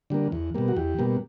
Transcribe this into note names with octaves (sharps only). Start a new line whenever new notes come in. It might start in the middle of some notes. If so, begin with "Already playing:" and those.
D3 G3 A#3
E2
B2 G3 A#3
F#4
E2 G4
B2 G3 A#3